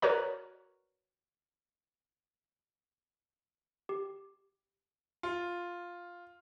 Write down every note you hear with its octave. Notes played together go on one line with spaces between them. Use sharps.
F#4 A#4 B4 C#5 D5 A#5
G4
F4